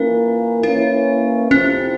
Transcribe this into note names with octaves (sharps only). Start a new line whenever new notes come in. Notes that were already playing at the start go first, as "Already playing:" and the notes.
Already playing: E3 A#3 C#4 F4 A#4
E3 A#3 C#4 E4
F2 C3 F3 C4 C#4 E4